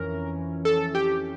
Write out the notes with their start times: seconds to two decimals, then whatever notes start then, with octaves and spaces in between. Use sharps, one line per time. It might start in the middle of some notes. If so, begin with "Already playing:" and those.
Already playing: F2 E3 C#4 A#4
0.65 A4
0.95 G4